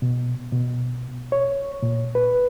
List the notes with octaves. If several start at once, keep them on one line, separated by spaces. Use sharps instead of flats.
B2
B2
C#5
A#2
B4